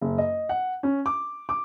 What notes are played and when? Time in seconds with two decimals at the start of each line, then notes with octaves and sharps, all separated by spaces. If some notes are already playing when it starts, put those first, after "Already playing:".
0.01 F#1
0.18 D#5
0.49 F#5
0.83 C#4
1.06 D6
1.49 D6